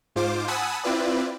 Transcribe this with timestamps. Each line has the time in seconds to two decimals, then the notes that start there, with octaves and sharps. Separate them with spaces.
0.16 G#2 F4 C5 D6
0.48 F#5 G#5 A5 B5 D#6 E6
0.84 C4 E4 F4 B4 D5